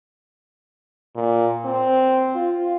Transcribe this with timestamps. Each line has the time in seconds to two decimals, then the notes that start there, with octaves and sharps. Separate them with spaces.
1.15 A#2
1.65 C4
2.35 F4